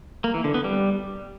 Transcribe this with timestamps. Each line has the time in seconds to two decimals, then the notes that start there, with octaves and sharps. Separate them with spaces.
0.24 A#3
0.34 E3
0.44 D3
0.54 B3
0.64 G3